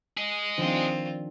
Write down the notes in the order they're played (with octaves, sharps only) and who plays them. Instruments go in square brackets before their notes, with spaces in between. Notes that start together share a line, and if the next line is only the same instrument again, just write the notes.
[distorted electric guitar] G#4 D#5
[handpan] D#3 F3 D4 [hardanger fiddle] C4 F4